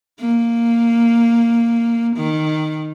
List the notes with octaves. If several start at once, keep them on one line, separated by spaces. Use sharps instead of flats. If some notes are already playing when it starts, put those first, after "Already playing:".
A#3
D#3